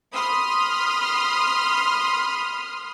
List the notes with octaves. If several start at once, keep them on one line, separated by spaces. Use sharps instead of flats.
B5 C6 D#6 F6